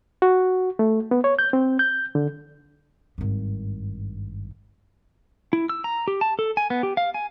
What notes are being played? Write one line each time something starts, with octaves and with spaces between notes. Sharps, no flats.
F#4
A3
B3
C#5
G6
C4
G6
D3
G#1 G2
E4
E6
A#5
G4
A5
A4
G#5
B3
G4
F5
G#5